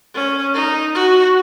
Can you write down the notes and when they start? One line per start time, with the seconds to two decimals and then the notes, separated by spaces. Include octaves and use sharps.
0.15 C#4
0.54 D#4
0.95 F#4